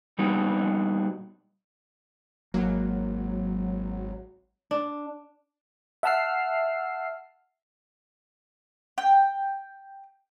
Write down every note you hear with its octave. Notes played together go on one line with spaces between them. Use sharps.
A#2 G3 B3 D4 D#4 F#4
G#1 F#3 A#3
D4
E5 F#5 A5 E6 F6 C7
G5